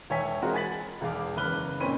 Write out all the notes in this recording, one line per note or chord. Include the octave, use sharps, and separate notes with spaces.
E1 C#5 E5 G5 G#5 B6
G#3 C4 F4 F#4 A#4
G#5 B5 A6 B6 F#7
E1 E2 G#4 F5 D6
F#1 B4 B5 F6 F#6 G7
F2 A#2 C4 C#4 B5 D#7